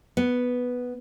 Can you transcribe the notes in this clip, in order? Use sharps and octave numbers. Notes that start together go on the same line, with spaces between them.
B3